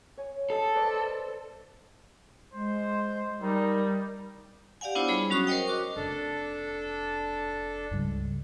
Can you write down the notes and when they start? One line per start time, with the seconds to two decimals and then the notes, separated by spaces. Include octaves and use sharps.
0.18 C#5 G#5
0.50 A4 D#5
0.75 B4 C5 D5
2.54 G#3 C5
3.42 G3 D#4 A#4
4.81 G4 D5 F5 F#5 G#5
4.95 B3 D4 E4 F4 C5 C#5
5.08 G3 G#4 C#5 B5
5.30 F#3 C#4 F#4 C#6 D#6
5.47 A#4 C5 C#5 D#5 G5
5.68 F#4 D6
5.96 F1 D4 A4
7.91 C#2 G2